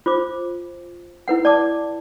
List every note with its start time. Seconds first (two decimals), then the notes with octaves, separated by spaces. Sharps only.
0.06 F4 C5 D6
1.28 E4 B4 F#5
1.45 D5 A5 D6